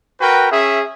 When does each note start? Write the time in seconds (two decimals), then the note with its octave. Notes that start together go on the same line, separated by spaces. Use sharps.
0.21 F#4 A#4 B4 G5
0.52 C#4 G#4 E5